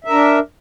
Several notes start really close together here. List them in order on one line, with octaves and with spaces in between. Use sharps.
E5 A#4 D4